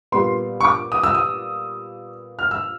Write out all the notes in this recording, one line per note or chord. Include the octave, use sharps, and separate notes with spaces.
A#2 G3 B3 C6
C#6
D6
D#6
E6
D#6
F6
E6